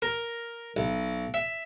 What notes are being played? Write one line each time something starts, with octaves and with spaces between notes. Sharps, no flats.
A#4
B1
E5